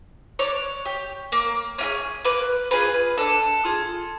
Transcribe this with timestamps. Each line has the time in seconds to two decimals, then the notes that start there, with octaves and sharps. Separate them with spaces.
0.39 D4 C#5
0.85 G4
1.32 A#3
1.78 C#4 F4 G#4
2.24 A#3 B4
2.71 C#4 F4 G#4 B4
3.17 D4 A4
3.65 F4 G#4